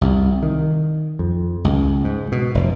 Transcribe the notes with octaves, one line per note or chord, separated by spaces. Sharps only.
C2
D#3
F2
C#2
G#2
B2
F1